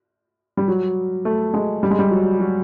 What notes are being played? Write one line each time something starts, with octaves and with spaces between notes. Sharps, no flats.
G3
F#3
A3
G#3
G3
G#3
G3
F#3
F#3